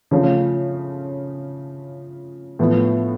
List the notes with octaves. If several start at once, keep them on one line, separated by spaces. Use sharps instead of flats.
C#3 F3 A3 C#4 F4
A2 F3 B3